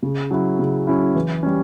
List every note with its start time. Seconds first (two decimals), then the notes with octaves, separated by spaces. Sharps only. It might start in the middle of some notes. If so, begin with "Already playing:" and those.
0.03 C#3
0.31 F#3 C#4 E4
0.59 C#3
0.87 F#3 C#4 E4
1.15 E3
1.43 G3 C#4